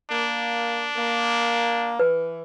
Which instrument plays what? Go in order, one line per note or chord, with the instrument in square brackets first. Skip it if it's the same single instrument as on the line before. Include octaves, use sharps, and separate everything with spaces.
[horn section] A#3 [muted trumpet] D4
[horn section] A#3
[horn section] E3 [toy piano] B4